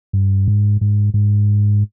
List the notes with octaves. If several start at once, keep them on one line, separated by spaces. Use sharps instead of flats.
G2
G#2
G#2
G#2